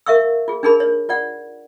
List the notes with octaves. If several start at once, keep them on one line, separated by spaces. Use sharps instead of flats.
A#4 E5 F5 C#6 E6
F4 G#4
D4 D#4 G#4 A#4 B5
C#5
F4 D5 F#5